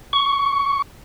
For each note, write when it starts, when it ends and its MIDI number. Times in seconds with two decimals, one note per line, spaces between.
0.13 0.82 85